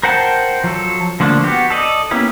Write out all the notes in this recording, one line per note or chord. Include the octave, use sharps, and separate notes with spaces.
A#4 C5 F#5 G5 A5
F3 F#3 A4
D3 F3 A3 A#3 D4
B3 F#4 G4
A4 D5 D#5
A#3 B3 C#4 E4 G4